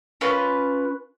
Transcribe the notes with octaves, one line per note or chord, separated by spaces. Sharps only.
C#4 F4 B4